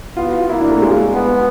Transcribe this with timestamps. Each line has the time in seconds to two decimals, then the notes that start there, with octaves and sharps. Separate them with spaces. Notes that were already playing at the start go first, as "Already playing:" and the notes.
0.17 B3 F4
0.28 F#4
0.38 F4
0.49 A#3 E4
0.61 D4
0.71 A3
0.82 G#3
1.14 B3